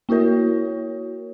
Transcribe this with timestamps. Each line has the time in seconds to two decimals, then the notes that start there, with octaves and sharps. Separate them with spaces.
0.09 A#3 E4 F#4 A#4 C#5